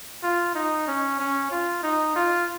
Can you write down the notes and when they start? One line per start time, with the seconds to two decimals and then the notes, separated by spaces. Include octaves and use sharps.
0.23 F4
0.55 D#4
0.87 C#4
1.19 C#4
1.51 F4
1.83 D#4
2.16 F4